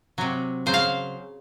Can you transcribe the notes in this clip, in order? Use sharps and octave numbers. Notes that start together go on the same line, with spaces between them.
C3 F#3
C#3 F#3 C5
F5